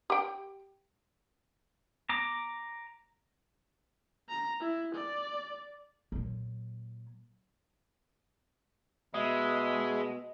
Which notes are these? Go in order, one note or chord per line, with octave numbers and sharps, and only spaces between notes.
G4 G5
A#5 D6
A#5
E4
D5
A#2 F#3
B2 G#3 D#5 E5 B5